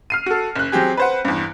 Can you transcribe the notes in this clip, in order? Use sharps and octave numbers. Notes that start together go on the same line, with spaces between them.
F6 C7 D#7
F#4 A4
F#1 F#6
F#3 C4 G4 G#4
B4 C5 F#5
E2 G2